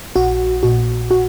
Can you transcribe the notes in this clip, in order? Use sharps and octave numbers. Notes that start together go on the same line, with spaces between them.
A#1 F#4
A#2 F#4
F#4